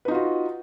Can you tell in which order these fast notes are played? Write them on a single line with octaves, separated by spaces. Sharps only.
B4 D#4 F4 F#4